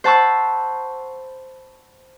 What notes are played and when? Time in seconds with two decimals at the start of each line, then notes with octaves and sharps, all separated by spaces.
0.04 C5 F#5 A5 B5 C#6 E6